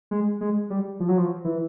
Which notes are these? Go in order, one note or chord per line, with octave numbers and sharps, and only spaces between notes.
G#3
G#3
G3
F3
F#3
F3
E3